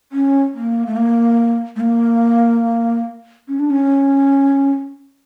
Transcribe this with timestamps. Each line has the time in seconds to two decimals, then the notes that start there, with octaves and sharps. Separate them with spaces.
0.12 C#4
0.54 A#3
0.86 A3
0.96 A#3
1.76 A3
1.80 A#3
3.48 C#4
3.59 D4
3.70 C#4